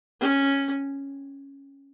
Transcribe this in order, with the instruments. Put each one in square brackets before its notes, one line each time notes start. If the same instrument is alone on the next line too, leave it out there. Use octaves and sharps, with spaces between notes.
[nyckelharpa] C#4